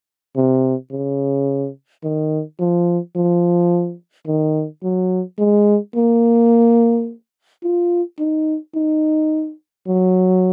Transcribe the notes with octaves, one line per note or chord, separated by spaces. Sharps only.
C3
C#3
D#3
F3
F3
D#3
F#3
G#3
A#3
F4
D#4
D#4
F#3